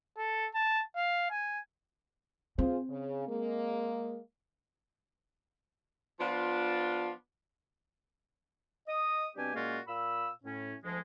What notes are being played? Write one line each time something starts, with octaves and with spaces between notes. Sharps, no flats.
A4
A5
F5
G#5
C4 F4 G#4 C5
C#3
G#3 A#3
F3 B3 D4 F4
D#5 D#6
B2 G3 C4 D4 G4 G#5
A#2 G#3 A#3 C#4 F4 F#4
A#2 F5 B5 E6
A2 C#4
D2 F3 G#3